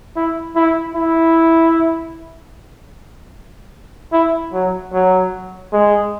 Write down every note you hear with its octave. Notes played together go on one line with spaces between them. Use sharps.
E4
E4
E4
E4
F#3
F#3
G#3